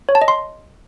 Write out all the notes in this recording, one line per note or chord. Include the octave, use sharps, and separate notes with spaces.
C#5
A5
D#5
C6